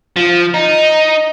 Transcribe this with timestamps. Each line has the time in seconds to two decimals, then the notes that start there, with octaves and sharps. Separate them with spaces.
0.16 F3
0.54 D#4